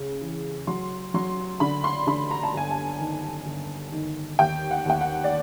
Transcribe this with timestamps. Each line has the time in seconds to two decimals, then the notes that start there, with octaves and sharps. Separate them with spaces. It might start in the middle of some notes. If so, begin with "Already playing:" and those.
Already playing: C#3
0.22 E3
0.67 F#3 C6
1.14 F#3 C6
1.60 D3 B5
1.84 C6
2.07 D3 B5
2.31 A#5
2.43 A5
2.54 G1 G#5
2.71 A5
2.99 D#3
3.46 G1
3.92 D#3
4.39 D#2 G5
4.71 F#5
4.86 D#2 G5
5.01 F#5
5.24 D5